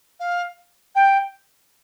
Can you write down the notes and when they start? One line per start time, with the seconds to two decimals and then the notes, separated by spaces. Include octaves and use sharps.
0.20 F5
0.95 G5